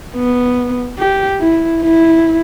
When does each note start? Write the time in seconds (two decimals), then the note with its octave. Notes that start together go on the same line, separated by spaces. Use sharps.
0.15 B3
0.98 G4
1.40 E4
1.82 E4